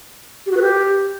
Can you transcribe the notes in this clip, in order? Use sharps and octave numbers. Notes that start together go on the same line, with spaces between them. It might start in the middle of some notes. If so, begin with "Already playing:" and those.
G4
F#4
B4
G4